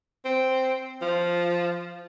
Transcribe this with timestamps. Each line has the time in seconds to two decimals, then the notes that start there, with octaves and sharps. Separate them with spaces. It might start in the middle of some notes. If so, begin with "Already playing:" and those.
0.25 C4
1.02 F3